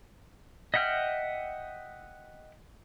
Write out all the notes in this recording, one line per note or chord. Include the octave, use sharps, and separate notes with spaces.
D#5 E5 F#5 G5 F6